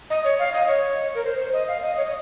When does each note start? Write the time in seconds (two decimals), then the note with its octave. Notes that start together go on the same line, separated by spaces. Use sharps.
0.10 D#5
0.24 C#5
0.39 F5
0.53 D#5
0.68 C#5
1.15 A#4
1.25 C5
1.39 C5
1.53 D#5
1.68 F5
1.82 D#5
1.97 C#5
2.05 D#5